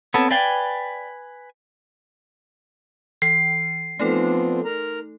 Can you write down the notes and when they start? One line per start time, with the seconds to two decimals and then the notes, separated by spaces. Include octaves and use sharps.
0.14 B3 C4 A4 C#5
0.31 B4 D5 F5 G5 G#5
3.22 E3 C7
3.99 F3 A3 B3 C4 D#4 A4
4.65 A#4 A#5